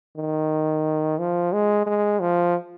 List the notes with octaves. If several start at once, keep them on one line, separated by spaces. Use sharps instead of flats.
D#3
F3
G#3
G#3
F3